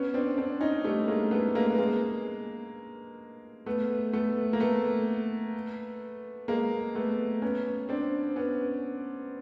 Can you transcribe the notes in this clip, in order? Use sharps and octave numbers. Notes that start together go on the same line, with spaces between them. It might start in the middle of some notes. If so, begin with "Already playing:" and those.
Already playing: B3 C#4
C4 D4
C4 D4
C#4 D#4
G3 A3
G#3 A#3
A3 B3
G#3 A#3
B3
G#3 A#3
A3 B3
A3 B3
A#3
A3 B3
G#3 A#3
A3 B3
B3 C#4
C4 D4
B3 C#4